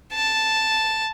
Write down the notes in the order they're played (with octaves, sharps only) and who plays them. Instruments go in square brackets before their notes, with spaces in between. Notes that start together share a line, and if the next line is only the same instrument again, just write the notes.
[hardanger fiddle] A5